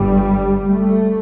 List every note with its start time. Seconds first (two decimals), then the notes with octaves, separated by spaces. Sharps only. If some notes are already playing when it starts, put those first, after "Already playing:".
Already playing: G1 G2 G3
0.68 A3